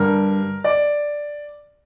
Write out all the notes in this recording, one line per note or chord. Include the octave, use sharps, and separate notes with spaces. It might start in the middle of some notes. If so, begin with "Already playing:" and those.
Already playing: G2 D3 G3 A#4
D5